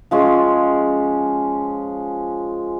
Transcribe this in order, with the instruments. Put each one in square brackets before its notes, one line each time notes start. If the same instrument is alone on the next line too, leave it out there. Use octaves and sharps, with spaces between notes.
[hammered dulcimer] F3 G#3 C#4